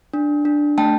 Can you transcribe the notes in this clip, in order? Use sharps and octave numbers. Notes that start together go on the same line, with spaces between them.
D4
D4
A3 G5 A5